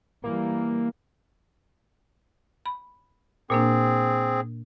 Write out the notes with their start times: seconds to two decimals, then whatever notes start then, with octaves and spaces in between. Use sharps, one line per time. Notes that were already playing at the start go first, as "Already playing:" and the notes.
0.24 E3 G3 A#3
2.66 B5
3.50 A#2 A#3 C4 D4 G#4